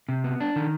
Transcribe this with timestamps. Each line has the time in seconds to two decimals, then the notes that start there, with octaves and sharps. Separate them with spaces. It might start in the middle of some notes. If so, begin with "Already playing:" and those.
0.09 C3
0.24 B3
0.40 D4
0.56 D#3